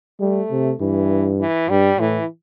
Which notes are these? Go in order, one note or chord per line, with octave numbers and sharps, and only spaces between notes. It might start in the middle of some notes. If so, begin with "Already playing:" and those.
G3 A3
C3
G2 E3
E3
G2 G3
A2 E3